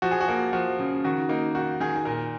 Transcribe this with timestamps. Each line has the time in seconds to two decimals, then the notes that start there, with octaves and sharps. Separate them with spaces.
0.02 F3 F#4
0.11 G#4
0.21 F#4
0.28 A#3
0.53 F3 F#4
0.79 C#3
1.04 D#3 F#4
1.29 A#3 D#4
1.55 D#3 F#4
1.80 D#3 G#4
1.96 G#4
2.05 A#2 A#4